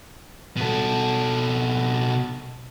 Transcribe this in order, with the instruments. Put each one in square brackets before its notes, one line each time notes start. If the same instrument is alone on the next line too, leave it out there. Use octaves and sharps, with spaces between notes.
[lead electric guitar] B2 A4